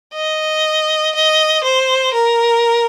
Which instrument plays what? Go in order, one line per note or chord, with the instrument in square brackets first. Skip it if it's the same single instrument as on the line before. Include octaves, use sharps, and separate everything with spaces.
[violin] D#5
D#5
C5
A#4